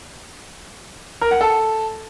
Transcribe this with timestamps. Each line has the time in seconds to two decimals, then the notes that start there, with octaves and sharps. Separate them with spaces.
1.21 A#4
1.31 F#5
1.41 A4